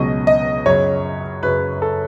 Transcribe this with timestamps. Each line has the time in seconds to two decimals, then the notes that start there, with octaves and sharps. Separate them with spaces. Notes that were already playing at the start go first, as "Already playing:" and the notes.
Already playing: C#2 B2 F#3 C#4 D#5
0.27 D#5
0.66 F#2 C#3 F#3 C#5
1.43 F#2 C#3 F#3 B4
1.82 A4